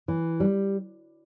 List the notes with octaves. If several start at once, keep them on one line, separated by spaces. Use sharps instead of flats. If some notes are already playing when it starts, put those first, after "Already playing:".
E3
G3